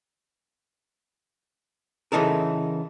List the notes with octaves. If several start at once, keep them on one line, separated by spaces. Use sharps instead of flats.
C#3 E3 D#4 A4 A#4